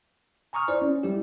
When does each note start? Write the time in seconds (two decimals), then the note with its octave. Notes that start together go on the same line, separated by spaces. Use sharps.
0.53 G#5 A#5 C#6 D#6 F6
0.68 E4 C5 D5
0.82 C#4
1.03 G3 E4 G4